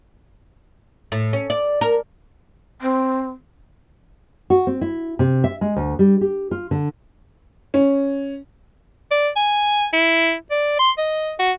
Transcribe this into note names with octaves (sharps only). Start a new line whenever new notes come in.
A2
C#4
D5
A#4
C4
F#4
C4
E4
C3
E5
G#3
D2
G3
G4
F4
D3
C#4
D5
G#5
E4
D5
C6
D#5
F#4